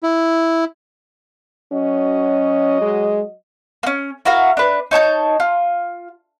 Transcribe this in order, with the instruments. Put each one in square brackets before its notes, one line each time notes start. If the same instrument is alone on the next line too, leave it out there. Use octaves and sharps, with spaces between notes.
[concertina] E4
[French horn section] F#3 F#4 D#5 [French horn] C#4
[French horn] G#3
[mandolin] A#3 C#4
E4 F#4 A#4 F5
D4 B4
D#4 C#5 A5 G6
F4